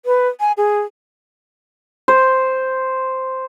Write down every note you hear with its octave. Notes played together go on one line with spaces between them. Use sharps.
B4
G#5
G#4
C5